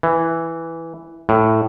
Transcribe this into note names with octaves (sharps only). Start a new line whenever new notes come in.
E3
A2